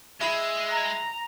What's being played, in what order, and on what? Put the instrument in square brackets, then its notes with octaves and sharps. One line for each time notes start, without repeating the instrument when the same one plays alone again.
[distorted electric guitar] G#3 [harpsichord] E4
[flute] A#5